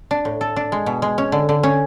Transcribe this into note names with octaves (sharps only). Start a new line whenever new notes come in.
D4
A2
A4
D4
G#3
B2
G#3
C#4
D3
D3
C#4